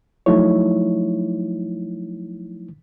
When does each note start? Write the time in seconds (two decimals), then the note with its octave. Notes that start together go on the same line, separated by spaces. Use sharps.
0.26 F3 F#3 A3 D#4 E4 C#5